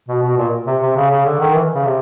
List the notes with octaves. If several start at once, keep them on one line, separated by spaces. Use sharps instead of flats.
B2
B2
A#2
C3
C3
C#3
C#3
D3
D#3
E3
C#3
C3